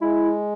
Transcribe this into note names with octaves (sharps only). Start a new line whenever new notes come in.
G#3 E4